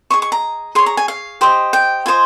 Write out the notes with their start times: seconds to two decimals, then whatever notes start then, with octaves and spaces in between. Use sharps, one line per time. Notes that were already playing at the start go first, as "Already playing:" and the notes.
0.10 G#4 C5 D#5 C#6
0.22 C#6
0.32 A#5
0.75 G#4 C#5 C6
0.86 A#5
0.97 G#5
1.08 F5
1.41 G4 C5 D#5
1.73 G5
2.06 F4 C5 D#5 G#5